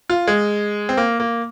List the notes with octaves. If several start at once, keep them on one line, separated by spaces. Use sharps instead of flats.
F4
G#3
C4
A#3
A#3